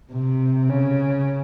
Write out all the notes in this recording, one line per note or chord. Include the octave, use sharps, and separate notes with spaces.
C3
C#3